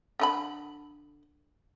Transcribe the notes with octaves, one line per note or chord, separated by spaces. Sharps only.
D3 F4 B5